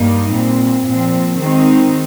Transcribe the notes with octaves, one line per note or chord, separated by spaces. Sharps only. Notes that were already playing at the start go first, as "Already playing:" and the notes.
Already playing: G2 G3 A#3 D#4
A#2 G3 C4
A#2 F3 C4
D#3 G#3 C4 D#4